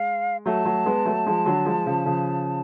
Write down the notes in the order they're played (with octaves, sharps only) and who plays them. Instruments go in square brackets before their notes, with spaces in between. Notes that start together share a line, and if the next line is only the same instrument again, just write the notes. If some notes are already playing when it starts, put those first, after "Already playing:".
Already playing: [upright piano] G#3 [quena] F5
[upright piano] F#3 A3 [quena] A5
[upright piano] F#3 A3
G#3 B3
F#3 A3
F3 G#3
D3 F#3
F3 G#3
C#3 F3
C#3 F3